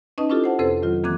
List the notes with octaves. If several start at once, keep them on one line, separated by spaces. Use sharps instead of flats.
C#4 D#4 B4 D#5 A5 D#6
C#4 D4 E4 F4 G4 A4
C5 F#5 A5
F2 C3 C4 A4 B4 C5
D#3 F#3 F4
E3 A#3 C4 D6 F#6 G#6